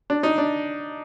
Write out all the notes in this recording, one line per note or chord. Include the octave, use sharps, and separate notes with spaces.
D4
D#4
D4